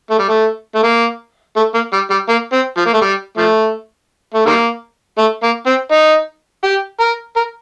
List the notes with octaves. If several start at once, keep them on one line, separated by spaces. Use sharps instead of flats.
A3
G3
A3
A3
A#3
A3
A#3
G3
G3
A#3
C4
F3
A#3
A3
G3
F3 A3
A3
D#3 G3 A#3
A3
A#3
C4
D#4
G4
A#4
A#4